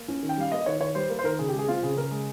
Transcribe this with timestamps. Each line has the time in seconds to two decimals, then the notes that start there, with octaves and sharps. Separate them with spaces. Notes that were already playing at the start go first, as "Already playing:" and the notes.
Already playing: A#3
0.08 C#4
0.23 D#3
0.29 G5
0.37 G3 F5
0.52 A#3 D#5
0.66 D#3 C#5
0.80 D#3 C#5
0.95 G3 C5
1.09 A#3 A#4
1.19 C5
1.24 D#3 A#4
1.39 C#3 G#4
1.48 G4
1.53 G#3
1.59 G#4
1.68 C4 F4
1.82 C#3 G#4
1.97 C#3 A#4
2.11 G#3